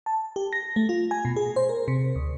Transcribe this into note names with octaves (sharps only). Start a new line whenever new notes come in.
A5
G4
A#6
A3
F4
G#5
B2
G#4
C5
A#4
C3
D2